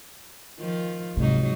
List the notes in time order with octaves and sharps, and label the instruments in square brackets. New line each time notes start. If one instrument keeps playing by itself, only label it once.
[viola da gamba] D#3 F3 F4
[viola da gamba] G#2 F#3 D#4 [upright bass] C3